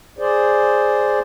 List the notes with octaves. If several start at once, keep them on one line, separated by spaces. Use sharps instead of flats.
G#4 C5 D5